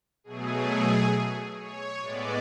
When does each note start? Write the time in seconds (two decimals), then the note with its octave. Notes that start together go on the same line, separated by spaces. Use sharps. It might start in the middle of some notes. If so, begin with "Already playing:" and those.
0.24 B2 F#3 A3 G#4
1.56 C#5
2.01 A2 G#3 B3 D5